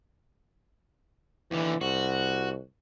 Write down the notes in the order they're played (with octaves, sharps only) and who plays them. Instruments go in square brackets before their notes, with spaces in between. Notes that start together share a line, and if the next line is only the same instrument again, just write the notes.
[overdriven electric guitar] D#2 D3 [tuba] E3
[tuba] C2 [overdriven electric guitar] F#4